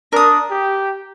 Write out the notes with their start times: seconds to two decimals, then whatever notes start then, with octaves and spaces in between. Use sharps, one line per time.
0.12 D4 A#4 D#6
0.50 G4